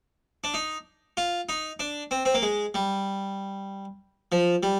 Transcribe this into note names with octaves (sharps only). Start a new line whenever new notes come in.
D4
D#4
F4
D#4
D4
C4
C4
A#3
G#3
G3
F3
G3